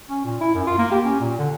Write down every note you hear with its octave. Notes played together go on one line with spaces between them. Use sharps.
C#4
A#2
E4
F#2
F4
A#3
G4
C#4
A#2
D3